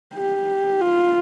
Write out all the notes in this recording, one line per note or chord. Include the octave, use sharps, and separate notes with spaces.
G4
F4